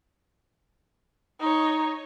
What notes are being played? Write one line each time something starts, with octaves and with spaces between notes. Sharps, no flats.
D#4 C#5